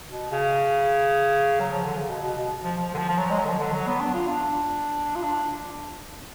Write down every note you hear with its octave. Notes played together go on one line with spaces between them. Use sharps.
B2
C#3
F#3
F3
D3
C#3
B2
B2
B2
F3
F3
D3
F3
F3
F#3
G#3
F#3
D3
F3
D3
F#3
B3
D4
F4
D4
F4
D4